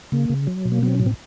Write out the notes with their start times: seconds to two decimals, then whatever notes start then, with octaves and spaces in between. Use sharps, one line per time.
0.12 C#3 A#3
0.30 C#3
0.47 F#3
0.65 B2
0.72 A#3
0.83 F#3 B3
0.89 C4
0.95 C#4
1.00 A2
1.06 C4